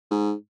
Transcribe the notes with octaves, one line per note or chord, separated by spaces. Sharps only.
G#2